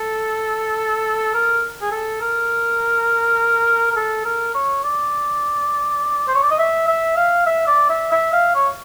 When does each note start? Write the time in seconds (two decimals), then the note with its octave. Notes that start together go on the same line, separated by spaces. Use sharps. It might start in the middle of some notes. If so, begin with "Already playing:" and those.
Already playing: A4
1.34 A#4
1.82 G#4
1.92 A4
2.21 A#4
3.92 A#4
3.96 A4
4.25 A#4
4.55 C#5
4.84 D5
6.28 C5
6.35 C#5
6.43 D5
6.51 D#5
6.59 E5
6.88 E5
7.17 F5
7.46 E5
7.67 D5
7.90 E5
8.12 E5
8.33 F5
8.55 C#5